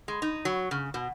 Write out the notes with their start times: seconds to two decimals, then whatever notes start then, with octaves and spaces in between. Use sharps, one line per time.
0.08 G#3
0.22 D#4
0.45 F#3
0.71 C#3
0.94 B2